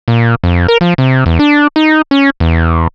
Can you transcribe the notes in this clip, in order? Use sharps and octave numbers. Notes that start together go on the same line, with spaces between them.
A#2
F2
A#4
F3
C3
E2
D4
D#4
C#4
E2